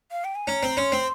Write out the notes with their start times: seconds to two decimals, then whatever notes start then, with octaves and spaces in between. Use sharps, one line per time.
0.11 F5
0.24 G5
0.35 G#5
0.47 C#4 A#5
0.63 C4
0.77 C#4 C6
0.92 C4